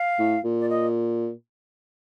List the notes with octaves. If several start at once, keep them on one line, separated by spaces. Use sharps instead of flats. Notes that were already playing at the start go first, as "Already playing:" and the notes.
Already playing: F5
A2
A#2
D5
D#5